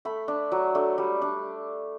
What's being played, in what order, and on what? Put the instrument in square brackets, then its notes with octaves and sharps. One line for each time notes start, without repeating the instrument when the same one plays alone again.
[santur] A3 B5
D4
F#3
A3 D4
G3
D4